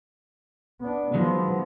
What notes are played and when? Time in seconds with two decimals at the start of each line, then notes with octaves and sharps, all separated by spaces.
0.81 B3 D4
1.14 D#3 F3 F#3 G#3 B3